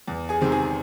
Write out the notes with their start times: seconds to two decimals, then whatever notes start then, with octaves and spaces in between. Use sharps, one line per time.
0.08 E2
0.29 G#4 G#5
0.41 C3 D#3 G#3 C4
0.52 G#4 G#5